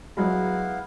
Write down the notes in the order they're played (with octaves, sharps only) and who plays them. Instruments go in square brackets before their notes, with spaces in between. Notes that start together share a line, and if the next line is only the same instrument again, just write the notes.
[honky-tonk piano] F#3 G#3 [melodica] B3 E4 F5